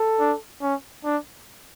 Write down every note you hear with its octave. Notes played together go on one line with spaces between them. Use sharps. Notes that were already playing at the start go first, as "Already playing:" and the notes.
Already playing: A4
D4
C#4
D4